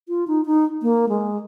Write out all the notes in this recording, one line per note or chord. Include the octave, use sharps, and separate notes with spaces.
F4
D#4
D#4
A#3
G#3